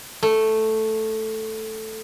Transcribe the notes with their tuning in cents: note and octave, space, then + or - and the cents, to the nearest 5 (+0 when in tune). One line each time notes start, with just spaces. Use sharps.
A3 +0